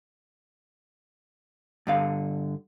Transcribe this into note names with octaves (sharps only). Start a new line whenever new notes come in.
G2 D3 F5